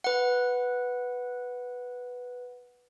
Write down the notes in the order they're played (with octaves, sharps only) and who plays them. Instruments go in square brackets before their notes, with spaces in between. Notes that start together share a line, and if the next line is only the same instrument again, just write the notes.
[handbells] B4 F#5